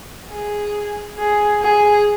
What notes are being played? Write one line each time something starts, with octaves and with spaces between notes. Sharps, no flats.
G#4
G#4
G#4